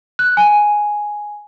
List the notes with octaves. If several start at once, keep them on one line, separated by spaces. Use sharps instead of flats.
F#6
G#5